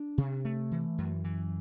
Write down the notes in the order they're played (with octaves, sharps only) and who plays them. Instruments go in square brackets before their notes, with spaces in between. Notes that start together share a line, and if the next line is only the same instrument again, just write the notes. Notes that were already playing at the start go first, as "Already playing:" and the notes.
Already playing: [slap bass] D4
C3
A3
E3
F#2
E3